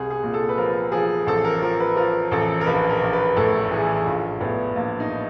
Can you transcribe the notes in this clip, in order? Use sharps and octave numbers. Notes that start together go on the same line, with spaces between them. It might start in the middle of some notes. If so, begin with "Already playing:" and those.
Already playing: C2 G#4
G#4
A#2
A4
B4
F3 A#4
F3 G#4
A1 A4
A#4
F3 A#4
B4
F3 A#4
A1 A4
A#4
A#1 B4
A#4
A#1
B4
A2 A4
E3 G#4
A#1 F4
A2 B3
A#1 A#3
D#4